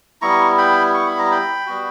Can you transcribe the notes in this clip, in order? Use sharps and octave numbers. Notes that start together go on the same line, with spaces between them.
G3 B3 E4 A#5 C#6
G5 B5
C#6
B5
A#5
G5 B5
G3 B3 F#4